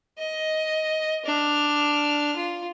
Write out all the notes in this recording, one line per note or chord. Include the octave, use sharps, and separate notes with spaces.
D#5
D4 F6
F4